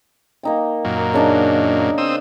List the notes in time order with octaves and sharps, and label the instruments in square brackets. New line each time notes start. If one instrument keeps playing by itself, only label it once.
[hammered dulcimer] A#3 D#4 G5
[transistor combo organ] F#2 A#2
[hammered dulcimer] C#3 D4 D#4
[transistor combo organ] C4 D#6 E6